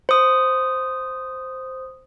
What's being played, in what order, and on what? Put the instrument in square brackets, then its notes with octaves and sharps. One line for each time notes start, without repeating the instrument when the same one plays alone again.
[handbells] C5 D#6